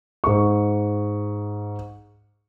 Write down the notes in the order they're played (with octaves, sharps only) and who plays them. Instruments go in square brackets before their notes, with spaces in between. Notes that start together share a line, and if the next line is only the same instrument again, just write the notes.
[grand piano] G#2 C#6